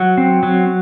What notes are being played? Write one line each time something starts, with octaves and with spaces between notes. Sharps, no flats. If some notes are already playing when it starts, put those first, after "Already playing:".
Already playing: F#3 F#5
C4
F#3